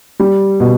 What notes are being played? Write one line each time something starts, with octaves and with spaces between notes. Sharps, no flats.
G3
B2